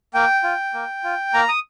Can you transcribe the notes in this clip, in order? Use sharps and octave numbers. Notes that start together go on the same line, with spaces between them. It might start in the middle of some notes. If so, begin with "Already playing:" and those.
A#3 G5
F4
A#3
F4
A#3 A#5
D#6